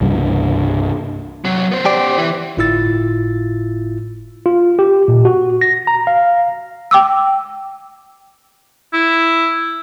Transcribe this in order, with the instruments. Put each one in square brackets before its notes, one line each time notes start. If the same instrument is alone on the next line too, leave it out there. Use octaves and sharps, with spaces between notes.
[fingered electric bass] C2 G2 C#3
[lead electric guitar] C3 F#3
B3 C5
[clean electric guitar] G4 D5
[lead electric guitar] E3
[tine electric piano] G1 A2 E4 F4 E6 A6
F4
G4
A#2
F#4
A#6
A#5
F5
[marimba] G5 D6 E6
[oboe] E4